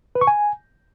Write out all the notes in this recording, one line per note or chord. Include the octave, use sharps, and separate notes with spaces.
B4
C#6
G#5